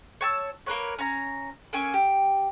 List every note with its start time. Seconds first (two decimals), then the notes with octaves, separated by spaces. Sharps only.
0.21 C#5 A5 E6
0.66 A#3 A#4 B4 C#5
0.98 C#4 A#5
1.73 A#3 C#4 G#5 E6
1.94 G4